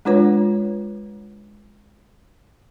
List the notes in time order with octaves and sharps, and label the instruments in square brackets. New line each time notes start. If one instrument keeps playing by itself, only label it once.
[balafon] G#3 D4 F4 B4 C#5